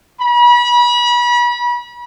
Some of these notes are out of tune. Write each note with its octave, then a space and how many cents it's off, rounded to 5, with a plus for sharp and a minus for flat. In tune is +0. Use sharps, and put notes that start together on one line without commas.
B5 -35